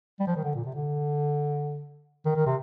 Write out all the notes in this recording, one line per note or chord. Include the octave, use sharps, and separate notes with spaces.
G3
F3
D#3
D3
A#2
C3
D3
D#3
D#3
C3